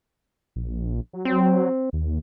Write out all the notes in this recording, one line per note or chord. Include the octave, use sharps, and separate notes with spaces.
A#1
F#3
C4
D#2